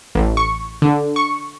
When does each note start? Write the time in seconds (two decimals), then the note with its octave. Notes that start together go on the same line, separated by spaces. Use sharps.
0.15 A1
0.37 C#6
0.82 D3
1.16 C#6